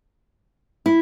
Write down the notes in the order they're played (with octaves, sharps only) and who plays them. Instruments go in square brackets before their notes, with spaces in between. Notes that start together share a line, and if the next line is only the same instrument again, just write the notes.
[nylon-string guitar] E4